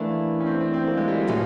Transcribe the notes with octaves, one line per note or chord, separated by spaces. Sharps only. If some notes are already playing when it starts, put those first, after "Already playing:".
Already playing: E3 A3 A#3 D4
C#4
C4
C4
C4
A#3
G#3
G3
F#3
A2 F3 G3 G#3 C#4